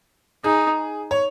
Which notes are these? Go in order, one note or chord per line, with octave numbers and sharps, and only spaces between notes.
D#4 G#4
C#5